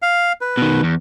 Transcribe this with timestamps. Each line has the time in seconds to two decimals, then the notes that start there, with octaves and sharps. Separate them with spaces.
0.02 F5
0.41 B4
0.57 B2 D#3
0.83 E2